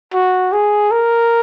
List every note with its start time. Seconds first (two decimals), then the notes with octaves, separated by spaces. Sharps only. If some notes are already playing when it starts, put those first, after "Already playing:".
0.14 F#4
0.53 G#4
0.92 A#4